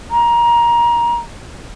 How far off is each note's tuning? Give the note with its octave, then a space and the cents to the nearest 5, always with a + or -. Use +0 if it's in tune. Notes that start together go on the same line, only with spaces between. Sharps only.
A#5 +20